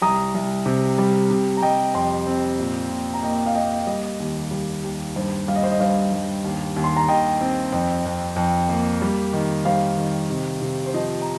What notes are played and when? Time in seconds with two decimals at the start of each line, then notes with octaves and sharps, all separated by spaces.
0.02 C2 A#5 D#6
0.34 C2
0.66 C3
0.98 G3
1.30 C3
1.57 A#5
1.62 G3 D#5 G5
1.94 F2 G5 C6
2.26 C4
2.59 A#2
2.91 A#2
3.14 A#5
3.23 A#3 D#5 G5
3.46 F5
3.55 A#3 D#5 G5
3.87 G3 D#5
4.20 D#2
4.51 G3
4.83 D#2
5.16 G2 C5
5.48 G3 F5
5.56 D#5
5.63 C5
5.72 D#5
5.80 G2 C5 F5
6.12 G2
6.44 D#2
6.76 D#2
6.84 C6
6.97 A#5
7.08 D#2 D#5 G5
7.41 C4
7.72 F2
8.05 F2
8.36 F2
8.69 A#3
9.02 G3
9.33 D#3
9.65 G3 C5 F5
9.97 D#3
10.30 C3
10.62 C3
10.86 C5
10.94 F3 D#5
11.21 A#5